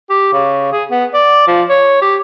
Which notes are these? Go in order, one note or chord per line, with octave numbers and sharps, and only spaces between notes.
G4
C#3
G#4
B3
D5
F3
C#5
G4